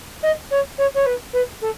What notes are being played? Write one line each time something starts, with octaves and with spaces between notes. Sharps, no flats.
D#5
C#5
C#5
C#5
B4
B4
A4